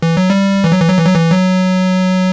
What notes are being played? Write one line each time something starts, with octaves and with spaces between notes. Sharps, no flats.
E3
F#3
G3
E3
F#3
E3
F#3
E3
F#3
E3
F#3